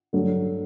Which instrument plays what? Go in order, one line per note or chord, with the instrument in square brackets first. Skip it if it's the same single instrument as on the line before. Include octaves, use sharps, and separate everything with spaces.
[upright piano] G2 F#3 A3